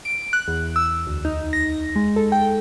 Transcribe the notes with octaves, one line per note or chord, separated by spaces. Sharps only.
D7
F#6
E2
E6
D2
D#4
A#6
G#3
A4
G5